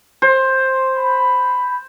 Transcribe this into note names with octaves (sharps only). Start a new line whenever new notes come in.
C5
B5